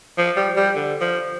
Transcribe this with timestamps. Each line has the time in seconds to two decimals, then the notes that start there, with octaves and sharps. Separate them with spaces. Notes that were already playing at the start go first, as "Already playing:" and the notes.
0.18 F3
0.36 G3
0.57 G3
0.76 D3
1.01 F3